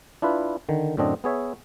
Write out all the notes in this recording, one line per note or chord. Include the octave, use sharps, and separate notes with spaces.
D4 E4 F4 B4
D3 D#3
F#2 A2 D3 C4 D4 D#5
B3 G#4 C#5 E5